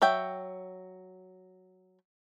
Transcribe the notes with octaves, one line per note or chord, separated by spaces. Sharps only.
F#3 E5 G5